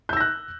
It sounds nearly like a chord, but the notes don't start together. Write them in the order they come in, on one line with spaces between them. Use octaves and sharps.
G6 E6 A#6 F#6